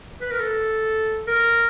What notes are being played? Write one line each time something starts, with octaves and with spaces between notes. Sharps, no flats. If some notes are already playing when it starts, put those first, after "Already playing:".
B4
A#4
A4
A#4